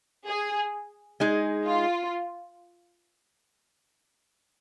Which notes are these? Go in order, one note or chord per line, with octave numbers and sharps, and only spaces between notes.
G#4
G#3 D#4 G#4
F4